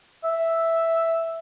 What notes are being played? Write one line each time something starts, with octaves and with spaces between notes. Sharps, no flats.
E5